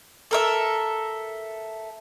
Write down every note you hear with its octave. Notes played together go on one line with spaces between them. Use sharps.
A4 A#4 E5